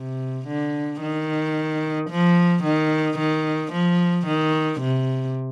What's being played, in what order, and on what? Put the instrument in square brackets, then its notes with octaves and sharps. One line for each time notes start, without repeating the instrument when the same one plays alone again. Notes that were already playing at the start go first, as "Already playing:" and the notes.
Already playing: [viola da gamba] C3
D3
D#3
F3
D#3
D#3
F3
D#3
C3